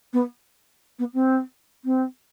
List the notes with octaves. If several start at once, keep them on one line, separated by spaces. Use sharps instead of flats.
B3
B3
C4
C4